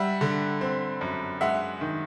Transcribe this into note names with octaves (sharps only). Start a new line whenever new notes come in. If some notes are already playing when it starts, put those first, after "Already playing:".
Already playing: G3 E5 F#5
D3
C4
F#2
G#3 E5 F#5
D#3